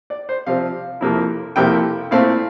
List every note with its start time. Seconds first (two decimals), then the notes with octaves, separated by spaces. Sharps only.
0.10 D5
0.29 C5
0.46 C3 F3 C4 F5
1.01 F2 C3 F3 A#3 E4
1.56 F2 C3 F3 A#3 E4 G5
2.11 A#2 A3 C4 E4 F5